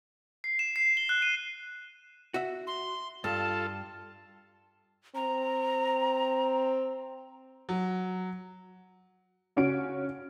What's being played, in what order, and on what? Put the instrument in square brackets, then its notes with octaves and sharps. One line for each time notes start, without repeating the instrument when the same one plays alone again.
[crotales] C7
E7
C7
G7
F#6
D#7
[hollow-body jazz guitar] F#4 E5
[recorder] C6
[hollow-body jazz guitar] G2 [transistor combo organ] F4 A4 [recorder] A5
[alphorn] C4 [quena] A#5
[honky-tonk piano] F#3
C#3 C#4 F#4 D7